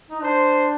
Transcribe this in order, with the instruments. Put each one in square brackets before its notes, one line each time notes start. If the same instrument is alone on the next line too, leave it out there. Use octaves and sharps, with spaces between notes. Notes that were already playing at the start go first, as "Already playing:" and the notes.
[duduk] D#4
[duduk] D4 [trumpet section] C5